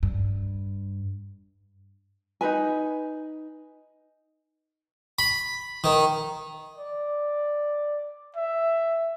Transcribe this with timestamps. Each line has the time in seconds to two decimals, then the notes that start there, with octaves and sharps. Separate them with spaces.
0.03 G2
2.41 D#4 G#4 B4 G#5
5.19 B5
5.84 D#3
6.78 D5
8.36 E5